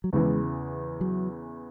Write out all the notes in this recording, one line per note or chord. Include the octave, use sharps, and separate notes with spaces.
F#3
E2 C#3 E3 G#3
F#3